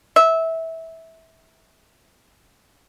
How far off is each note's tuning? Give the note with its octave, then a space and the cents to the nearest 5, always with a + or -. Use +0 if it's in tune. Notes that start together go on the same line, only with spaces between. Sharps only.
E5 -20